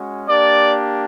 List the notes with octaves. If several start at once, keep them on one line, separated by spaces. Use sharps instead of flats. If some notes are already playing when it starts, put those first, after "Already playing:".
Already playing: G#3 C#4 F#4
A#3 D4 G4 D5